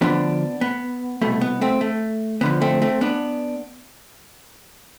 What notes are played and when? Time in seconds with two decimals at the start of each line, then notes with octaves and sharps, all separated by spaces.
0.01 D2 D3 F3 B3 D4
0.61 B3
1.22 C2 B2 A3
1.41 B3
1.61 A3 C4
1.81 A3
2.41 D2 D3 F3 B3
2.61 A3 C4
2.82 A3 C4
3.01 B3 D4